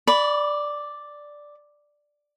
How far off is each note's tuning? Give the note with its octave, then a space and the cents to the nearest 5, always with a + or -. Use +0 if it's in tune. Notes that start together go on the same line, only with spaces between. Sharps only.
D5 +0 B5 +0 D6 -45